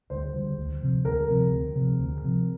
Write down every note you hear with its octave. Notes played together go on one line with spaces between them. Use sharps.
D2 C5
D3 G3
D2
C3 F3 C4
D2 A#4
C3 F3 C4
D2
C3 F3 C4
D2
C3 F3 C4